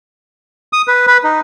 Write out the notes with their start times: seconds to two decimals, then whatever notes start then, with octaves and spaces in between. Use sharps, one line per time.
0.73 D#6
0.88 B4
1.07 B4
1.24 D#4